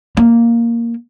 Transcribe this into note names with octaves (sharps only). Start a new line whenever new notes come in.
A#3